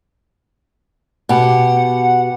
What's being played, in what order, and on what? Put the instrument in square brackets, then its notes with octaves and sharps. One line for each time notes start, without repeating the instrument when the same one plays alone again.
[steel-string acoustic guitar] B2 G4 [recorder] F#5